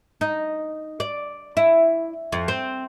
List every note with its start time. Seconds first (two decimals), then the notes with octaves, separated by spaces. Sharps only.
0.21 D#4
1.00 D5
1.57 E4
2.32 F2
2.48 C4